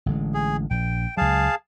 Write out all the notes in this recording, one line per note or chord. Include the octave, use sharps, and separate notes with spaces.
A1 D3 G#3
G#4
A#1 G5
C#2 F#3 G#4 F5 A5